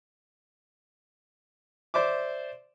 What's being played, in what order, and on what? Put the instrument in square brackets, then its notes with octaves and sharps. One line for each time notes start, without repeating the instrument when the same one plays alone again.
[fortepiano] C5 D5 E5 D6